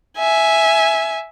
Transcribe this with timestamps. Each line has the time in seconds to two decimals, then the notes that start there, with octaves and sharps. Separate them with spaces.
0.18 E5 G#5